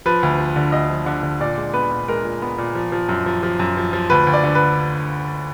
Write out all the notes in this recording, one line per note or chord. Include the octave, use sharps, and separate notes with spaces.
F3 B4
D2
F3
D3
D2 D#5
F3
D3
D3
A#2 D5
G#3
B3 B4
A#2
G#3 A#4
A#2
B3
A#2
F3
F3
F#2
F3
F3
F#2
F3
F3
D2 B4
D2
D5
D3
B4